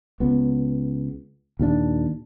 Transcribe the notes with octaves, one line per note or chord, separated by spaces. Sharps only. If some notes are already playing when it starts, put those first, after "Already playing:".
C#2 B3
D#2 A#2 G3 D4